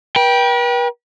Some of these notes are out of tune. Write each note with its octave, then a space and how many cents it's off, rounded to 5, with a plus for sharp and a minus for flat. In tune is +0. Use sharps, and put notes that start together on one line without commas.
B4 -40 G5 +0